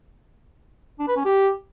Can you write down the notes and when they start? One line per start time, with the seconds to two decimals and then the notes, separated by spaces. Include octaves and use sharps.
0.99 D4
1.08 B4
1.16 C#4
1.25 G4